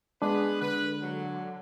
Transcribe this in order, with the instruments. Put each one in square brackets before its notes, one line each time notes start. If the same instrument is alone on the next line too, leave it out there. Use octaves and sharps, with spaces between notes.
[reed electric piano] G#3 D4 [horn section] B3 G#4 B4
[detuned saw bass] D3 [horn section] B4
[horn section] F#3